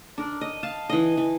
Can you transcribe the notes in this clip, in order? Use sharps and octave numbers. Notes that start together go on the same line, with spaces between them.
D4 A#4
D#5
F5 A5
E3 D#5
E3